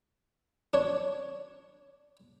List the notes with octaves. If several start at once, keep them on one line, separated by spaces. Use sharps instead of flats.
D4 C#5